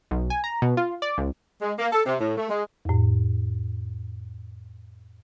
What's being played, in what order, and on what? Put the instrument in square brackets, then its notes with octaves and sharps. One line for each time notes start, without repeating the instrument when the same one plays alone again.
[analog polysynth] B1
G#5
A#5
B2
F4
D5
C#2
[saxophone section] G#3
A#3
A4
C3
A2
A3
G#3
[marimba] F2 A2